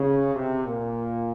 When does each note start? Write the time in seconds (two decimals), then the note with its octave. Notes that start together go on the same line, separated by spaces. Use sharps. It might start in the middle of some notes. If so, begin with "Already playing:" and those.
Already playing: C#3
0.35 C3
0.65 A#2